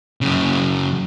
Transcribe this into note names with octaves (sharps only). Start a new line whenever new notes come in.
F#2 C#3